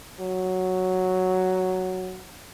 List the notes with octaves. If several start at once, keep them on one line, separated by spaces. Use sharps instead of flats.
F#3